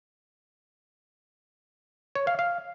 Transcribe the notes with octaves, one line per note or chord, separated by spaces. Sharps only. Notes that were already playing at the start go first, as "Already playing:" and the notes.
C#5
F5
F5